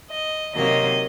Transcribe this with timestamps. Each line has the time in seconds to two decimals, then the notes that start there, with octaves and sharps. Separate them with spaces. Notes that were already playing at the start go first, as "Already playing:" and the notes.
0.12 D#5
0.54 C3 D#3 F#3 A#3 D#5